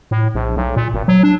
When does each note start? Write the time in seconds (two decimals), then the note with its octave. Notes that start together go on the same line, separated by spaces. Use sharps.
0.11 A2
0.35 A#1
0.57 B1
0.76 A#2
0.94 G#1
1.08 F#3
1.23 D4